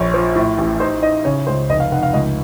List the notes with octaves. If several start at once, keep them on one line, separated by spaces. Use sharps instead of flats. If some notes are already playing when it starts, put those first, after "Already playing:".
Already playing: A#1 C#5
F3
A2
A1
D#4 C5
D#4 D#5
C#3 C#5
C#2 C5
F1 D#5
F5
F1 F#5
F5
C#2 D#5